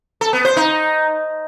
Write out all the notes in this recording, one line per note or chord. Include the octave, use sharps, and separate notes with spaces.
A4
B3
C5
D#4